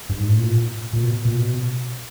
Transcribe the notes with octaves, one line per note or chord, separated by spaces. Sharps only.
G2
G#2
A2
A#2
A#2
B2
A#2
B2